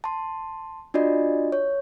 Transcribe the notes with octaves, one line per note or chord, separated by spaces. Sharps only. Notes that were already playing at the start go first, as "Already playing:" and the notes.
A5 C6
D4 F4 F#4 D5 D#5
C#5